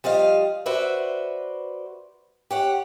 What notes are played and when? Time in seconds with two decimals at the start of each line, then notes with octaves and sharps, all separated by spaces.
0.04 F3 G3 D#5 F5
0.66 F#4 B4 C5 D5 E5
2.51 G4 C#5 F#5